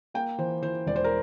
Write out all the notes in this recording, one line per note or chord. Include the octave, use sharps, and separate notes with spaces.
A#3 G5
E3 C5
E3 C5
E1 D5
C5
A#4